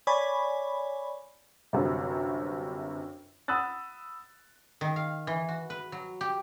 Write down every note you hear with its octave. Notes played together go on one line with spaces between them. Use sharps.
C#5 D5 G#5 B5
G1 F#2 C3
F#5 B5 D#6 E6 F#6 A6
D#3
F5
E3
F#4
B4
F#3
G4